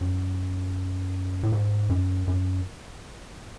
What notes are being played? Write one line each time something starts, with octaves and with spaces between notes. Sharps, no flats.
F#2
A2
G#2
F#2
F#2